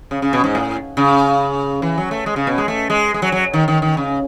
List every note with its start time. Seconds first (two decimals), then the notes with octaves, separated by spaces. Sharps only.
0.11 C#3
0.22 C#3
0.33 B2
0.44 G#2
0.55 A2
0.97 C#3
1.82 E3
1.98 F#3
2.11 A3
2.26 G#3
2.36 C#3
2.47 B2
2.58 G#3
2.68 A3
2.90 G#3
3.14 G#3
3.22 F#3
3.32 F#3
3.53 D#3
3.68 D#3
3.82 D#3
3.97 C#3